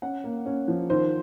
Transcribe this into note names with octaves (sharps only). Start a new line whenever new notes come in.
C#4 F#5
A#3
C#4
F3
D#3 C5